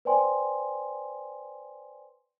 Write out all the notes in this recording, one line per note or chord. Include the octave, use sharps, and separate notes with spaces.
B4 C5 D5 G5 G#5 C6